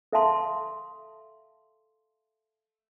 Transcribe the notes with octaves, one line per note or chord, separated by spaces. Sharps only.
A4 E5 F5 A5 C6